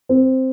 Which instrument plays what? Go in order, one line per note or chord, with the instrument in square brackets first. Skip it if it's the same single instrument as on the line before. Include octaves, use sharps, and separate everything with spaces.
[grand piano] C4